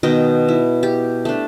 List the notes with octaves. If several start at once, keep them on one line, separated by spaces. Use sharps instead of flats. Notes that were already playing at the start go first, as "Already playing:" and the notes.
B2 D#3 D#5 G5
E4
G4
A3 D4